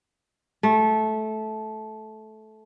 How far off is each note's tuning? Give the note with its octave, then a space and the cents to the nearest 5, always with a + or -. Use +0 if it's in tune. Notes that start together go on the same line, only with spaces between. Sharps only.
A3 -15